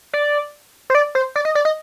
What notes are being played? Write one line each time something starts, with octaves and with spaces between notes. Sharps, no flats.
D5
C5
D5
C5
D5
D#5
D5
D#5